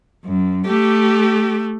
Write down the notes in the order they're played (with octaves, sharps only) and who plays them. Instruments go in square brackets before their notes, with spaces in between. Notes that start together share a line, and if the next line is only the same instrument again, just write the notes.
[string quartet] F#2
[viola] A3 [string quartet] G4